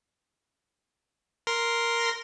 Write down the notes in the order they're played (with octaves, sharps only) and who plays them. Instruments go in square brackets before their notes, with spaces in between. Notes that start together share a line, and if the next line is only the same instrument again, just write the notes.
[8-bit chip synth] A#4 C6 A#6